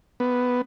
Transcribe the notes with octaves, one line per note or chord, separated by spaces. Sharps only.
B3